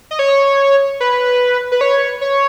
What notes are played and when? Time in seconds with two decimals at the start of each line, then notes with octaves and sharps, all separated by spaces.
0.11 D#5
0.19 C#5
1.00 B4
1.72 B4
1.81 C#5
2.21 C#5